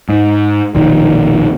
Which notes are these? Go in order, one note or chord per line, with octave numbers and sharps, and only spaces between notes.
G#2
E1 A#1 D#3